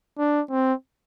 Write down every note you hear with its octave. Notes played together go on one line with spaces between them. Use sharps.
D4
C4